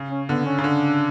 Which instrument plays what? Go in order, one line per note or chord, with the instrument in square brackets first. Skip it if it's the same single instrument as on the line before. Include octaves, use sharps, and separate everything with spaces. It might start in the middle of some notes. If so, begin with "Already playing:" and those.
Already playing: [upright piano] C#3
[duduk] C#4
[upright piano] D3 [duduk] B3
[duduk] C#4
[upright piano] C#3 [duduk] C#4
[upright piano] D3 [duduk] D4